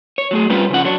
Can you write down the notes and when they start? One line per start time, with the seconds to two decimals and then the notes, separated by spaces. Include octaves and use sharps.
0.18 C#5
0.31 F#3 A3 G#4
0.50 G3 C4 C#4 F4 B4
0.70 C#3 F3 G3 C#4 F#5
0.84 F#3 D4 C#5